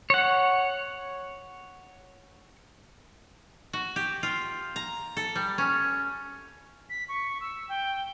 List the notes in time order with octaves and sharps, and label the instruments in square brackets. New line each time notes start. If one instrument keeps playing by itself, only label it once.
[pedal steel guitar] C#5 F#5
[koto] F#4
G4
F4
A#5
A4
G3
C#4
[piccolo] B6
C#6
E6
G5